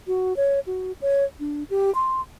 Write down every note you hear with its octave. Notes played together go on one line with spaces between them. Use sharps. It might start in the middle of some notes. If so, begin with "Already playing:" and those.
F#4
C#5
F#4
C#5
D4
G4
C6